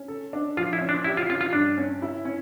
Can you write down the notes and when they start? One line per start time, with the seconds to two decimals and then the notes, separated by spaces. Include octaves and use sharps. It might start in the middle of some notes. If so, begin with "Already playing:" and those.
Already playing: C#4
0.08 A4
0.33 D4
0.57 F3 F4
0.73 E4
0.81 C#4
0.89 D4
1.04 E4 G4
1.17 F4
1.29 C#4 F4
1.41 F4
1.53 G2 D4
1.78 C#4
2.02 E4
2.25 C#4